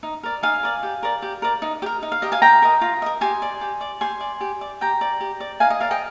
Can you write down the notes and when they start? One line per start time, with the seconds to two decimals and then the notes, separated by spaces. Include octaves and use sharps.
0.03 D#4
0.23 A#4 D5
0.43 D#4 F5 G#5
0.63 A#4 D5
0.83 G4
1.03 A#4 D5
1.22 G4
1.42 A#4 D5
1.62 D#4
1.82 G4
1.86 A#4
2.03 D#4
2.12 F5
2.22 G4 A#4 D#5
2.32 F5 G#5
2.42 F4 G5 A#5
2.62 A#4 D#5
2.81 F4
3.02 A#4 D#5
3.21 G4 G#5 C6
3.42 D5
3.61 G4
3.81 D5
4.01 G4 G#5 C6
4.21 D5
4.41 G4
4.61 D5
4.81 G4 G5 A#5
5.01 D5
5.21 G4
5.40 D5
5.60 D#4 F5 G#5
5.70 D#5
5.80 A#4 D5 F5
5.91 D#5 G5